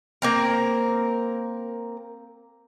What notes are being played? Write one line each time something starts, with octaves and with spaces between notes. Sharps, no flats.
A#3 C4 A#4